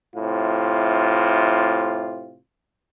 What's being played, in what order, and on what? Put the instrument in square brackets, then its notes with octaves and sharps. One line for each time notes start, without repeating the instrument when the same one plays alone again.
[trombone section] A2 C3 F4